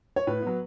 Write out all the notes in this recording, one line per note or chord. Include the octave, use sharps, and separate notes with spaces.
C#5
A2 B4
F#3 B3